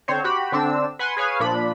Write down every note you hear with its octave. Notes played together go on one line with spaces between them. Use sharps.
D3 C4 C5 C#5
F#4 G4 B5
D3 C4 D4 E6
B4 F#5 G#5 C6
G#4 B4 C#5 F5 G#5
A#2 F3 D4 B5